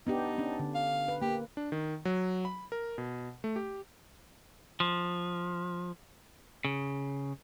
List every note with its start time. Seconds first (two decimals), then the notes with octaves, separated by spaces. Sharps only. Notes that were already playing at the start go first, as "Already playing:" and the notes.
0.07 B3 D4 D#4 G4
0.38 C#4 D4
0.59 D3
0.75 F5
1.08 B4
1.22 A#3 G4
1.57 D4
1.72 D#3
2.05 F#3
2.45 B5
2.72 A#4
2.98 B2
3.44 A3
3.56 G4
4.80 F3
6.65 C#3